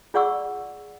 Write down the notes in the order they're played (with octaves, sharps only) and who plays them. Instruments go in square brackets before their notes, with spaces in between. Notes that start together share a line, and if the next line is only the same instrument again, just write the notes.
[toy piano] F4 G#4 D5 F#5 C#6 E6